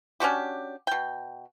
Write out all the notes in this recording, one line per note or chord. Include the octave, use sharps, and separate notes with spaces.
C#4 D4 F#4 G4
B2 G5